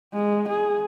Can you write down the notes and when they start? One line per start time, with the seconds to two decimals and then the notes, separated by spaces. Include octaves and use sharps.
0.13 G#3
0.49 G#4